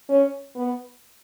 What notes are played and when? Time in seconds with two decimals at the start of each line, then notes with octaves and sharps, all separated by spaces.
0.09 C#4
0.56 B3